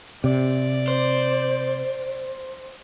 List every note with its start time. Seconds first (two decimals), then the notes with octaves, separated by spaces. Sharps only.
0.24 C3 D5
0.88 C5